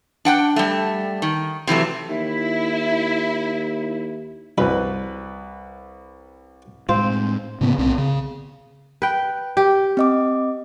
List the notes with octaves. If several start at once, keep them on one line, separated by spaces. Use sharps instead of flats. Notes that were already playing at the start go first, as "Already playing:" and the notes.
D4 F#5 G5
G3 A3
D#3
C3 E3 F#3 A3
D#2 E4
C2 C#4 D#4 F#4 B4 B5
A2 G#3 C4 F4
A2 C#3 A#3 B3
B1 B2 C4
C#3
B4 G5
G4
C4 D#5 D6